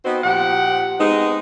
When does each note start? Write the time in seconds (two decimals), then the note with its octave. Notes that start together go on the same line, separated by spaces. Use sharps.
0.04 B3 C4 D#4 F#4 C5
0.23 A#2 F3 G4 F#5
0.99 G#3 B3 C4 D#4